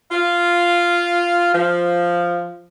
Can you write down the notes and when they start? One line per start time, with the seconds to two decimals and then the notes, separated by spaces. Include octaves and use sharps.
0.12 F4
1.53 F3